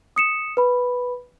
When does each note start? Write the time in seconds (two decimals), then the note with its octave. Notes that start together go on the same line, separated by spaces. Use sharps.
0.16 D#6 C#7 E7
0.57 B4 B5